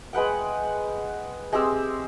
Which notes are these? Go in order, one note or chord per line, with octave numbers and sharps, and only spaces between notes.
G#3 B4 F#5 G5
G#3 C4 G4 E6